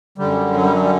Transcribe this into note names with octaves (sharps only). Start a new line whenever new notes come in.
F#2 D3 G3
F#3
G3
F#3
G3